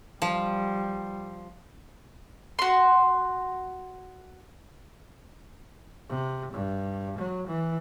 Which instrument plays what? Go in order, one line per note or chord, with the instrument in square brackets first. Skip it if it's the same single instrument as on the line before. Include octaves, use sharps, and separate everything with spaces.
[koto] F3 [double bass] G3
[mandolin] F#4 C6
[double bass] C3
G2
F#3
E3